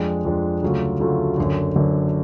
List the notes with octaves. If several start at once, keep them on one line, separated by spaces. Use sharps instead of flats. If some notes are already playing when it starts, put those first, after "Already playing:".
Already playing: F2 F3 G#3 D4
F2 F3 G#3 D4
D2 C#3 F#3 A3 F4
D2 C#3 F#3 A3 F4
F#1 F#2 D3
F#1 F#2 D3